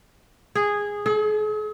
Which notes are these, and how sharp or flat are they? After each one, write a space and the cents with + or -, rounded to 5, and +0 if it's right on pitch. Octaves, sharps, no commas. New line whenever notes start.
G#4 -10
G#4 +45